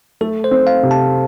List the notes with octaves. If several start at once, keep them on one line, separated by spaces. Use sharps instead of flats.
A3 A4
C5
C4
F5
C3
A5